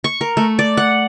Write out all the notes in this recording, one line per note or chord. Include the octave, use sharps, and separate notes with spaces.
C#6
A#4
A3
D5
F#5